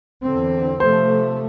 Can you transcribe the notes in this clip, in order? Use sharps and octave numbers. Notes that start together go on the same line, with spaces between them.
E2 D3 C4
C3 F3 A3 C5